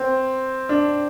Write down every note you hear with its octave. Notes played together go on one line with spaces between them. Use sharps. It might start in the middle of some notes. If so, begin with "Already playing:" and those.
Already playing: C4
D4